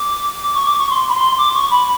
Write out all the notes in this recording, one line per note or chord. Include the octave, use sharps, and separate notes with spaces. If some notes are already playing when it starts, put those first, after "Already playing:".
Already playing: D6
D6
C#6
D6
C#6
C6
B5
C6
D6
C#6
B5